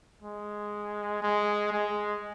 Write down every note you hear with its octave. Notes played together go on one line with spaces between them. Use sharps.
G#3
G#3
G#3